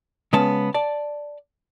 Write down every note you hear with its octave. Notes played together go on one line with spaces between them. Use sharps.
C#3 G#3 B3 C#4 A5
D5 A5